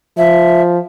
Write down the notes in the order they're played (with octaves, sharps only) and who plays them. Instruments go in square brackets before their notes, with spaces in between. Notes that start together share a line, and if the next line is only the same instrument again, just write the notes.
[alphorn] F3 [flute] E5